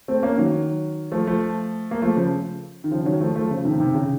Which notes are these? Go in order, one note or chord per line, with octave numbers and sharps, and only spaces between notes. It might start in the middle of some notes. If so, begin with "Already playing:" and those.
A3 C4
A#3 C#4
D#3 F#3
F3 A3
F3 A3
A#3
F3 A3
C#3 F3
D#3
C#3 F3
D#3 F#3
F3 A3
F3 A3
C#3 F3
C3 D#3
C3 D#3
C#3